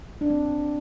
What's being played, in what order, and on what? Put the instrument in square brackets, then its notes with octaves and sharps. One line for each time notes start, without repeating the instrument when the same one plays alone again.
[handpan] D4
C4